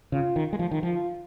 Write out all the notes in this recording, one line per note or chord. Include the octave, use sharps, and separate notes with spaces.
C#3 F4
D#3
G#3
F3
D#3
F3 F4